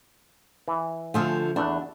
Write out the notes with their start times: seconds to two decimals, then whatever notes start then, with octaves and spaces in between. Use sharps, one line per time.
0.68 E3
1.14 D3 F3 A3 F4 G#4 E5
1.56 E2 A3 D4 F#5